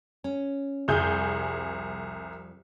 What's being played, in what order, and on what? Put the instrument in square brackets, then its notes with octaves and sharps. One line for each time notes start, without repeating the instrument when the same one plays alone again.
[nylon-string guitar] C#4
[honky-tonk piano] C2 G#4 G6 [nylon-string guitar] F2 F3 G3